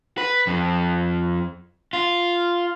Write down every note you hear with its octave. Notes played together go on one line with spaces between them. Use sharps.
B4
F2
F4